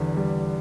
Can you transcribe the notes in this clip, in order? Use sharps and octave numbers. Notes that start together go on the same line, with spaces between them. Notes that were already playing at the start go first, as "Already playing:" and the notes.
Already playing: E2 D3 G3 B3
G3